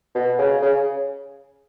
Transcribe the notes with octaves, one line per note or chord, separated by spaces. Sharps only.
B2
C#3
C#3